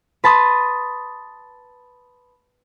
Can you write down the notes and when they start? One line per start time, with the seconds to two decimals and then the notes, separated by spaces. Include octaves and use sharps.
0.24 B4 A5 C6 D#6 A6